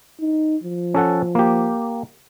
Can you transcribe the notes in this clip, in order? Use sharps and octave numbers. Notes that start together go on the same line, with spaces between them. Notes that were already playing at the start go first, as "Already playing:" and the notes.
D#4
F3
C#4 A4 F#5
A#3 G4